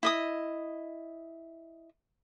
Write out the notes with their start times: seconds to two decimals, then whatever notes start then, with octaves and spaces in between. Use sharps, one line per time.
0.03 E4 D#5 D#6